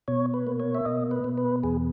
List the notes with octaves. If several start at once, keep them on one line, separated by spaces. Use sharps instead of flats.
B2 C#5
B4
A#3
C#5
E5
B2 D#5
B4
B2
B4
E2 G#4